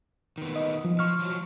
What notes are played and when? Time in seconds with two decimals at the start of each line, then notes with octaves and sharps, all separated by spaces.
0.38 D#3 B3
0.56 D#5
0.85 F3
0.99 F3 C#6 F6
1.19 F3 F#3